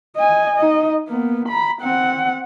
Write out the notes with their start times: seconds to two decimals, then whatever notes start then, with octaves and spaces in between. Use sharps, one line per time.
0.16 D#5 G#5
0.56 D#4 D#5
1.08 A#3 B3
1.49 A#5 B5
1.81 C4 F#5